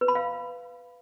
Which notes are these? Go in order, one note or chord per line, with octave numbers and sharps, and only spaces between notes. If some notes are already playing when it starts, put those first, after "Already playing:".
B4
B5
F5